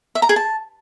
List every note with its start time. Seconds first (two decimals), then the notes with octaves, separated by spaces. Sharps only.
0.15 E5
0.22 A#5
0.29 G#4
0.36 A5